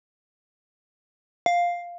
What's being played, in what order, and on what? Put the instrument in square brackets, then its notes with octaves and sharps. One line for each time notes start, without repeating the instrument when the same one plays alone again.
[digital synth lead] F5